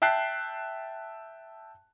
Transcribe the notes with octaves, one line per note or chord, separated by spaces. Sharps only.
E5 G5 A5 F#6 C7